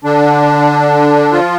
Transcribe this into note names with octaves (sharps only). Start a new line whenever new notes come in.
D3 D4
F3 F4